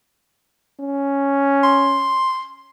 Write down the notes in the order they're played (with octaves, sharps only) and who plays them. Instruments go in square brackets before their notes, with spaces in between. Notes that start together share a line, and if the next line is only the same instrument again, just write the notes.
[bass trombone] C#4
[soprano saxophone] C6